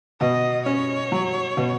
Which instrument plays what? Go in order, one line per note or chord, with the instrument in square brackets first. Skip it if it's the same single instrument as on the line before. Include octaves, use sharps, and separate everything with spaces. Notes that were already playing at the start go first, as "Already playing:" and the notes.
[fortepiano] B2 [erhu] D#5
[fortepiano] C#4 [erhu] C#5
[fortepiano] F#3
B2